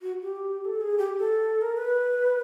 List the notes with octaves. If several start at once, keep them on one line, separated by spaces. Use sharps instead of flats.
F#4
G4
A4
G#4
G4
A4
A#4
B4